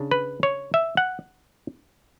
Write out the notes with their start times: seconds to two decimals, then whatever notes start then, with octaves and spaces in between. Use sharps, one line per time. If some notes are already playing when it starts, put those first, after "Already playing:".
Already playing: C#3 D4
0.11 B4
0.43 C#5
0.74 E5
0.97 F#5